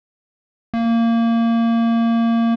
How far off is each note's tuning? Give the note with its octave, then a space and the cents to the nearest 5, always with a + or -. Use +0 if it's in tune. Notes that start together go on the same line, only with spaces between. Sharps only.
A#3 -20